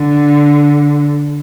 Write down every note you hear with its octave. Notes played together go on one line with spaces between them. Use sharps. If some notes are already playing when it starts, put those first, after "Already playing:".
Already playing: D3